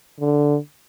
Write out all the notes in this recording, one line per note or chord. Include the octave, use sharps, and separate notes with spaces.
D3